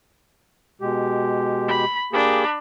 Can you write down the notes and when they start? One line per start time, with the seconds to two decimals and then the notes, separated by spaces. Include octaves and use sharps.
0.81 B2 G#3 G4
1.68 B5
2.13 A#3 D4 G4 G#4 B5